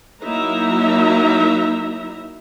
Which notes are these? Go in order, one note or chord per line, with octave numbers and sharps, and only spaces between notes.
F#3 A#3 D#4 E4 E5 A#5